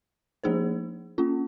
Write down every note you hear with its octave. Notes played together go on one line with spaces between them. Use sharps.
F3 A#3 D#4 G#4 C5
A#3 C#4 F4